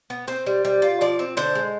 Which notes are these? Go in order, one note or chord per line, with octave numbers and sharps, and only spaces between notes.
B3
C4 C5
G3
G3
F4
F3 D5
C4
D3 C5
G#3